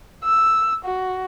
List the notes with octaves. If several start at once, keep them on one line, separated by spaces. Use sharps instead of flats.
E6
F#4